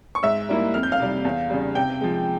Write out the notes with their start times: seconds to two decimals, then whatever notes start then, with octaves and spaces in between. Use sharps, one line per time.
0.15 C#6
0.23 G#2 E5 E6
0.49 G3 A#3 E4
0.74 F2 F6
0.83 G6
0.92 F5 F6
0.99 C3 G3
1.25 E2
1.50 C#3 G3
1.75 C3 G5 G6
2.01 F3 G#3